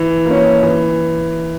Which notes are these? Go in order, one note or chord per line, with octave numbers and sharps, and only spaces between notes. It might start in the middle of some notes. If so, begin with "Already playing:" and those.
Already playing: E3
A#3
C#4
E3